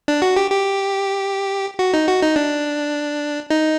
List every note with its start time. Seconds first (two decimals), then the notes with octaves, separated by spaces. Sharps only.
0.08 D4
0.22 F#4
0.36 G4
0.50 G4
1.79 F#4
1.94 D#4
2.08 F#4
2.22 D#4
2.36 D4
3.50 D#4